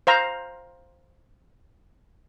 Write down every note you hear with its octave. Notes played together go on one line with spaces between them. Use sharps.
C5 F5 A#5